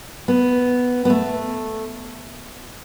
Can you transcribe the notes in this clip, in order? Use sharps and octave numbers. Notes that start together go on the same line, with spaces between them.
B3
B3
A3